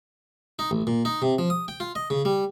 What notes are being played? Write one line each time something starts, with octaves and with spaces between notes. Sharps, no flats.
D#4
A1
A#2
D#4
C3
F3
D#6
G5
F4
D#5
C#3
G3